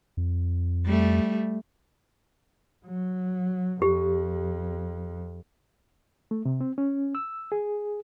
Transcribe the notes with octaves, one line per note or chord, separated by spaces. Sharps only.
F2
G3 A3
F#3
F2 G4
A3
C3
C4
C#4
E6
G#4